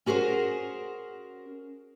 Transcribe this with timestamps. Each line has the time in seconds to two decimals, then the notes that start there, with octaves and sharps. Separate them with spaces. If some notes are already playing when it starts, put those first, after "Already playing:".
0.06 C#4 F#4 G#4 A#4 C5